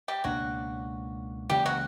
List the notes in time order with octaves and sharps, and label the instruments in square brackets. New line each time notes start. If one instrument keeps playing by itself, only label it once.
[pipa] G3 G4
[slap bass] C#2 B2 A#3 D4 [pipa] F#3 F#4
[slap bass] C#2 C#3 E3 A#3 [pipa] G3 G4
[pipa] F#3 F#4